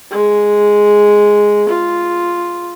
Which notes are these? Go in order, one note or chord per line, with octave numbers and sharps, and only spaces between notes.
G#3
F4